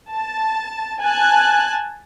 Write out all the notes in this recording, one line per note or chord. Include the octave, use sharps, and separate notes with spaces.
A5
G#5 A5 F#6